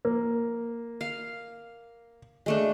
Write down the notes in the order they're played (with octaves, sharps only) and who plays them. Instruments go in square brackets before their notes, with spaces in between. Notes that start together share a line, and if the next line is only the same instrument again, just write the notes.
[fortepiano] A#3
[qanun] F5
G#3 A3 D4